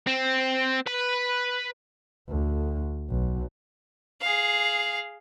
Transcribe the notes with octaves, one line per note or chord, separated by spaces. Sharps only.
C4
B4 B5
D2
B1
G#4 F5